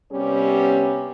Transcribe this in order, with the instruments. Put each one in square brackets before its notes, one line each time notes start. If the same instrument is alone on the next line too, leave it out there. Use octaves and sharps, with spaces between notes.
[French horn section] C3 G3 B3 C#4 G4